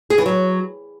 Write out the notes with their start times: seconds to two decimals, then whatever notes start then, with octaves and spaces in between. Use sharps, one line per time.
0.10 G#4
0.18 E3
0.26 F#3